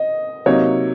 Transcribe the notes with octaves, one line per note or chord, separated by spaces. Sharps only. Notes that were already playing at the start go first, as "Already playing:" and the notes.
Already playing: D#5
C3 F#3 A#3 D#4 C#5